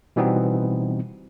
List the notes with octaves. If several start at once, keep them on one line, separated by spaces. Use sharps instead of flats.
B2 E3 G3 B3 C4 D#4